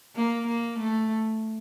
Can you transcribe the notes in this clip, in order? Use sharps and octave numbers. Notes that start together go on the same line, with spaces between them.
A#3
A#3
A3